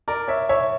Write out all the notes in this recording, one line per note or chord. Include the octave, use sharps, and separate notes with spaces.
A#4 D5
C#5 E5
C#5 E5